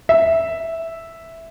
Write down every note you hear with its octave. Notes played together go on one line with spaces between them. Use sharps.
E5